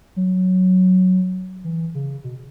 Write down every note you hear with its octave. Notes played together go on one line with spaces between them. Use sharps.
F#3
E3
C#3
B2